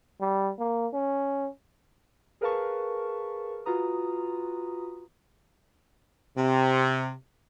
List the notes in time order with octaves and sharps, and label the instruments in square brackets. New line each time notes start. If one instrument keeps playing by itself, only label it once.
[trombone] G3
A#3
C#4
[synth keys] G#4 A#4 B4 F5 A5 C#6
F4 F#4 B4 A#5 D#6
[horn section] C3